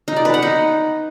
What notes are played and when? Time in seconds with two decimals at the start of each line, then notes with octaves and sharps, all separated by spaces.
0.08 D#4
0.16 D5
0.25 B4
0.34 F#5
0.42 D#4